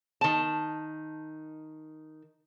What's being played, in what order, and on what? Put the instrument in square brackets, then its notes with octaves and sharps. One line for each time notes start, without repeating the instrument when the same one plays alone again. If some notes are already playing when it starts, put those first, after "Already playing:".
[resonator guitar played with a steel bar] D#3 A5